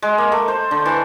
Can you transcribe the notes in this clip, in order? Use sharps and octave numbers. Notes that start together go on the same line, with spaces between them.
G#3
A#3
A3
C5
D3
E3